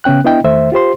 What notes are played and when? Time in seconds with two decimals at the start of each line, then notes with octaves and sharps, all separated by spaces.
0.04 C#3 B3 C#4 G5 F#6
0.24 B3 D4 E4 D#5 G5
0.44 E2 D#3 A3 C5 E5
0.72 F4 G4 C5 C6